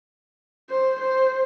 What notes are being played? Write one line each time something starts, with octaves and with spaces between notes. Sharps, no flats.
C5
C5